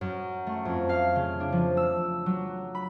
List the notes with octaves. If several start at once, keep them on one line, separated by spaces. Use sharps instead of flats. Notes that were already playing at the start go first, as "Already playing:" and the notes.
F#2
A3
F2
F5
C#3
D4
F3
E6
F#3
B5